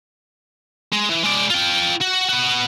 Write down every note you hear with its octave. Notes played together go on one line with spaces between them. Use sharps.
G#3
E3
G#3 D5
F4 G5
F#4
B3 F#4